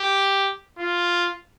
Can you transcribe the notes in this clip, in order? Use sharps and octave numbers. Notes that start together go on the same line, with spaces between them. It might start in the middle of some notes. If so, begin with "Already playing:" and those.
Already playing: G4
F4